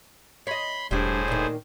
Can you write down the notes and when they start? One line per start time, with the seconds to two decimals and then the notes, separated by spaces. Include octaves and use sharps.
0.47 C#5 D#5 B5 C6
0.91 E1 A2 G3 D4 G#4 C5
1.28 A#2 D#3